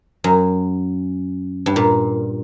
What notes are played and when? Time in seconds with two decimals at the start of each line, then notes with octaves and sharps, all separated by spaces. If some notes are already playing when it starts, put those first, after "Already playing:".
0.24 F#2
1.66 G2
1.76 A#2